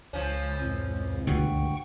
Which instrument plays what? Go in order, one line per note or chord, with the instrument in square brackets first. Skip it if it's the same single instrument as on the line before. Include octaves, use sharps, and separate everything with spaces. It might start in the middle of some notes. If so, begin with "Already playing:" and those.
[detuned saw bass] C#2 [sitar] F3 C#4
[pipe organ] F2 A2
[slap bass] D2 G2 B2 [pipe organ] F#5 G5 C#6